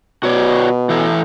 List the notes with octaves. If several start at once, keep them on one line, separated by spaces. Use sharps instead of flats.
B2 F#4 C#5 D5
E3 A4